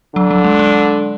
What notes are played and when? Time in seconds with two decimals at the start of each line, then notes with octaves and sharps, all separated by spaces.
0.15 D3 F#3
0.31 F#3
0.44 G#3
0.59 G#3